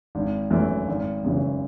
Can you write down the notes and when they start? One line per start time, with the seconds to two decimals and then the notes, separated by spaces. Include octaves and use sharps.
0.15 G#1
0.51 F#2 E3 A3
0.88 G#1
1.24 F#2 C#3 E3